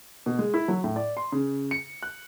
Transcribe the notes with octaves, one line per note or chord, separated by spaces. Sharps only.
B2
G#3
E4
F#3
A2
D5
C6
C#3
C#7
F#6